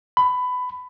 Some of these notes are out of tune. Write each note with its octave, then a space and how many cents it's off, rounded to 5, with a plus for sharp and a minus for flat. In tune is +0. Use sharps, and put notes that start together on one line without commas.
B5 +20